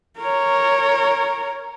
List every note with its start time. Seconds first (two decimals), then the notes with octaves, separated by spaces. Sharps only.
0.19 A#4 C#5